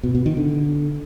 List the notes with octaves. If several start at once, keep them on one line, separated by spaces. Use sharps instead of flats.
B2
B2
D#3
D3